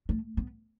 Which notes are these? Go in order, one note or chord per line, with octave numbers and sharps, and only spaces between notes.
A3
B3